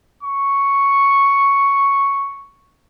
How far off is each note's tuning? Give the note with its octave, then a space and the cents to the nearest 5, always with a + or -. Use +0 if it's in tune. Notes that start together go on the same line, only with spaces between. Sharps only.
C#6 +0